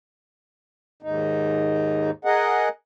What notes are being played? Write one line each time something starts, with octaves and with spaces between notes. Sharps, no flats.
D#2 G#2 D#4
G#4 A#4 D#5 F#5